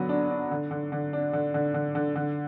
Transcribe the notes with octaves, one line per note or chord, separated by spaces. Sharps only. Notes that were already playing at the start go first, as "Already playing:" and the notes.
Already playing: D3 F#3 B3
D4
D4
D3
D3
D3
D4
D3
D3
D3
D3
D3